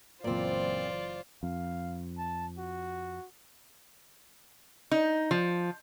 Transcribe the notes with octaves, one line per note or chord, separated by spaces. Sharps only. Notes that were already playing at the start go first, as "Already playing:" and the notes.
F#1 A#2 E3 C4 F4 C5 D5
F2 F5
A5
F#4
D#4
F3